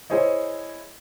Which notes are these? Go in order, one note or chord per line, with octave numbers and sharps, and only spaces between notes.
E4 G#4 C5 C#5 D#5